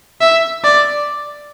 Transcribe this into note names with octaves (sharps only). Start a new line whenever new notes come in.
E5
D5